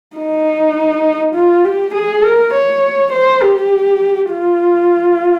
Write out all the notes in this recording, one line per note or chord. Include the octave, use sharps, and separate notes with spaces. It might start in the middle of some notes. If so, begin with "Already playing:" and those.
D#4
F4
G4
G#4
A#4
C#5
C5
G4
F4